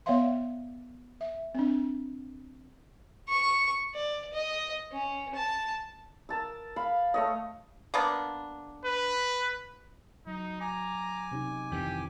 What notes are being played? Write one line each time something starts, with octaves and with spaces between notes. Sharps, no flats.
B3 C#5 D5 E5 F5 C6
E5
C4 D4
C#6
D5
D#5
C#4
A5
A#4 A5 E6
F5 B5
A3 C#5 D#5
A#3 B3 D4
B4
F#3 D#4
G#5 A#5 D6
C3 C#4 D#4
F2 D#3 E3 C#4 E4 G4